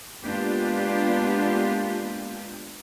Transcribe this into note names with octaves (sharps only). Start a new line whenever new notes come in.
G#3 A#3 B3 D4 F4 G4